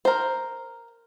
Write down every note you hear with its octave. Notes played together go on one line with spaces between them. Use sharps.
A#4 C5